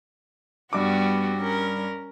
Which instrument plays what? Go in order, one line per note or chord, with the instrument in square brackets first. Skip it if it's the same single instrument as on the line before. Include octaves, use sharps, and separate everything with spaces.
[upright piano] G2 D6 [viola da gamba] G3 B3 F#4
[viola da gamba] C#4 A#4